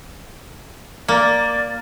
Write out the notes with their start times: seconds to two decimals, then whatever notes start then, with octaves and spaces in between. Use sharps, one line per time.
1.08 A#3 D5